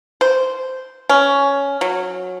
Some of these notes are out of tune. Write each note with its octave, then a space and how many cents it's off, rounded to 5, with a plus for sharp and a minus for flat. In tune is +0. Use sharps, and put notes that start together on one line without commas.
C5 -10
C#4 +10
F#3 -20